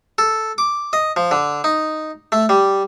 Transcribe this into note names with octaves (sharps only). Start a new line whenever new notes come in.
A4
D6
D#5
F3
D3
D#4
A3
G3